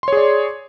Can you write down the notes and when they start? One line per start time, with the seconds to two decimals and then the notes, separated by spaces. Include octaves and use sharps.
0.03 C6
0.08 C#5
0.12 G#4
0.17 D5